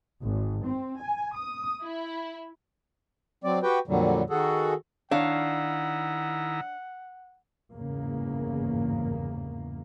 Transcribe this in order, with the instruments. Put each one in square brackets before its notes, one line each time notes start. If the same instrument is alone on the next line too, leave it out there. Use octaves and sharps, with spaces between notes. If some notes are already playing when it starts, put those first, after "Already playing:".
[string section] G#1
C4
G#5
D#6
E4
[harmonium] F#3 C4 D5
F#4 G4 B4 G5
F2 A#2 D3 F#3 G3
D#3 F#4 G#4 A4
[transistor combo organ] D#3 E4 A#5 [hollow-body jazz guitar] D4 [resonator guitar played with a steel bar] C#5 F5 [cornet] F#5
[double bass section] G1 E2 G#2 C#3 A#3